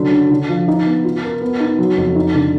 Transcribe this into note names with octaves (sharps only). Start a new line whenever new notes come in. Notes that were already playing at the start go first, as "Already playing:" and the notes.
Already playing: D3 F#3
D4
D3
F3
D#4
B3
F4
A#4
B3
D#4
F#3
F2
D#4
D3